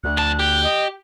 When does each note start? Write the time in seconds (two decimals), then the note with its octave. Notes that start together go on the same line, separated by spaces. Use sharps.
0.04 D2 F#6
0.17 F2 A5
0.39 G4
0.63 D#5